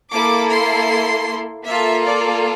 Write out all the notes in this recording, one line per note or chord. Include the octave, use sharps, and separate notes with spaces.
A#3 E4 A4 D6
C6
A#3 F4 A4 E5
D5